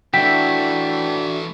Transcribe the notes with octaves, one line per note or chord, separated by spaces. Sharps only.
E3 A3 D4 E4 F#4 G5 B6